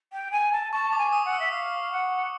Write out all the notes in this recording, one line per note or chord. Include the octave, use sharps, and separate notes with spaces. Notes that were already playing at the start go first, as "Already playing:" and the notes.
G5
G#5
A5
A5 C#6
D6
G#5
D#6
F#5
E6
E5
F5 D#6
F#5